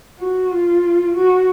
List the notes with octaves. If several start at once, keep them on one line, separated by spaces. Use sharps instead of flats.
F#4
F4
F#4